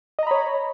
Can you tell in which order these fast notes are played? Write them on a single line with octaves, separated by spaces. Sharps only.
D#5 A#5 B5 C#5